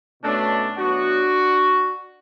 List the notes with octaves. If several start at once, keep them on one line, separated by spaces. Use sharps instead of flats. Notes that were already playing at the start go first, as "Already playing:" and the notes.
B2 A3 C#4 D4
A2 F#3 B3 D4 F#4